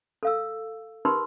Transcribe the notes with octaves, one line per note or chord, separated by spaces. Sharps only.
A4 F5 E6
D#4 G4 A#4 B4 B5 C6